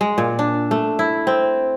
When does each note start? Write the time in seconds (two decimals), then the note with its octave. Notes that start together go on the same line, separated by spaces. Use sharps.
0.01 G#3
0.18 A#2
0.39 D4
0.71 A3
0.99 E4
1.27 C4